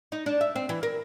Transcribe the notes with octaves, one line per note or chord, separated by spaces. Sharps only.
D#4
D4
E5
C4
E3
A#4